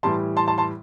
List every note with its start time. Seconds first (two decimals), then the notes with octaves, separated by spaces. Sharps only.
0.03 A2 E3 G3 A5 C6
0.37 A5 C6
0.48 A5 C6
0.58 A5 C6